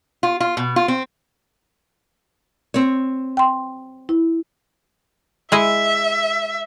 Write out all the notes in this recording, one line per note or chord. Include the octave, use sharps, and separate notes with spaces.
F4
F4
B2
F4
C4
C4 C#5
G5 C6
E4
G#3 E4 D#5 E5